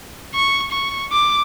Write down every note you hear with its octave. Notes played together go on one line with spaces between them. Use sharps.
C#6
C#6
D6